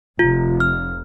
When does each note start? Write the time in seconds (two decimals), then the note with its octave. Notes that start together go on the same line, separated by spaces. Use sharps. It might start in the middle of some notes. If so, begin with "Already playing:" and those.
0.19 F1 F4
0.60 F6